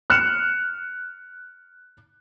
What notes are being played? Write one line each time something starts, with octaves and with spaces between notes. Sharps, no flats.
F6 F#6 C#7 E7